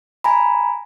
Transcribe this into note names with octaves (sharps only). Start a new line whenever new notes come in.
G#5 A#5 B5